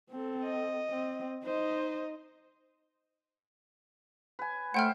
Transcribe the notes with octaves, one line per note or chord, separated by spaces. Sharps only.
C4 A4
D#5
C4
D#4 C5 D#5
B4 G#5
A3 C5 F#5 G5 F6